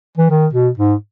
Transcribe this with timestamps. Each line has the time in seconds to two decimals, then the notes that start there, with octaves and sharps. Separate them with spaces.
0.17 E3
0.30 D#3
0.53 B2
0.77 G#2